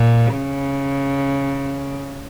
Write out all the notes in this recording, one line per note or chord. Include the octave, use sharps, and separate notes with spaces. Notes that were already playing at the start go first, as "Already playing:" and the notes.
Already playing: A#2
C#3